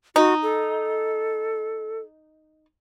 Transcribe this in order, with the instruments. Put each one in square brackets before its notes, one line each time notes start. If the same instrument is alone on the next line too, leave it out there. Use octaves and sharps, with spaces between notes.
[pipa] D#4 [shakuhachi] F#4
[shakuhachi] A4